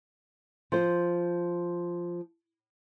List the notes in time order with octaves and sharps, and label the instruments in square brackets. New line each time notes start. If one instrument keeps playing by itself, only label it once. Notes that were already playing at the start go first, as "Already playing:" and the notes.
[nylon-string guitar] F3 C5